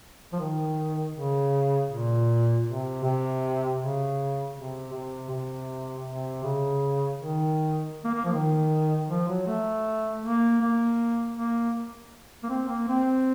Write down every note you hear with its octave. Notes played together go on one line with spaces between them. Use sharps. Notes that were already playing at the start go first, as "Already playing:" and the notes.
F3
D#3
C#3
A#2
C3
C3
C#3
C3
C3
C3
C3
C#3
D#3
A#3
A#3
F3
D#3
F3
F#3
A3
A#3
A#3
A#3
A#3
C4
A#3
C4